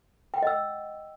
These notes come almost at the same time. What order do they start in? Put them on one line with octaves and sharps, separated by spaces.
G5 F#5 D#5 E6